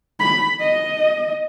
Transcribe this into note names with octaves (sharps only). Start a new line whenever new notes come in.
B5
D#5